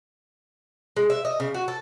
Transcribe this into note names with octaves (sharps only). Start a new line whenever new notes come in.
G#3
E5
D#5
C#3
F#4
A4